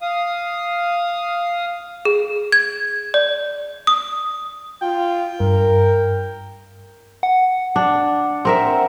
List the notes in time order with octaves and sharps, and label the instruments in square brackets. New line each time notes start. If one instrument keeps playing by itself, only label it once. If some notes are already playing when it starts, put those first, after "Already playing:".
[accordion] F5 D#6
[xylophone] G#4
G#6
D5
D#6
[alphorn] F4 [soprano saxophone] G5
[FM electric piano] G2 [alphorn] A#4
[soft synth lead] F#5
[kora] D4
C4 A#4 E5